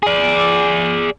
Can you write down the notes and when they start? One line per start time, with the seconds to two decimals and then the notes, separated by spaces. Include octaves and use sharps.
0.03 G#4 D5